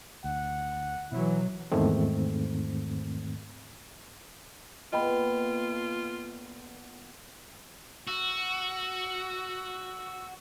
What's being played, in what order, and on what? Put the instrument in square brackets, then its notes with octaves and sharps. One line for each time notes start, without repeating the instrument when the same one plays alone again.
[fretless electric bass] D2 [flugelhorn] F#5
[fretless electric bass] B2 B3 [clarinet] E3 [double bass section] F#3 [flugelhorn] E4
[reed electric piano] E2 G#2 D#3 A3 C4
[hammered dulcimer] A#2 B3 A4 [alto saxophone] F4 [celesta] D#5 G5 B5
[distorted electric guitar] F#4 [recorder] E6